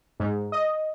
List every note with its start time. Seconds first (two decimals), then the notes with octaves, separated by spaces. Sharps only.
0.20 G#2
0.52 D#5